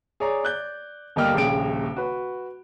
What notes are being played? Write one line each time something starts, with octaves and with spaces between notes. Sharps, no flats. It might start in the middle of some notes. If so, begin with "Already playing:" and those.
G#4 C#5 D5 A#5
D5 F#6 G6
G1 G3 A#3 D#5 G5 F6
D#1 A#1 C#3 G5 D7
F#4 B4